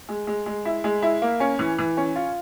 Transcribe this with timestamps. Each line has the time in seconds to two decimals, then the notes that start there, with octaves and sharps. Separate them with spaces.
0.09 G#3
0.27 G#3
0.46 G#3
0.65 E4
0.84 G#3
1.02 E4
1.22 A#3
1.40 C#4
1.59 E3
1.79 E3
1.97 C#4
2.16 F4